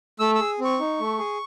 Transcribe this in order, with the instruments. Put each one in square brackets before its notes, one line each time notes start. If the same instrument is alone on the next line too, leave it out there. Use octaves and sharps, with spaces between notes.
[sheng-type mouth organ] A3 E6
E6
G#4
C4 C#6
D#4
A3
G#4